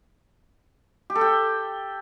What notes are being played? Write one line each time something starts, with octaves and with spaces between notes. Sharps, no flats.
G4
A4
G5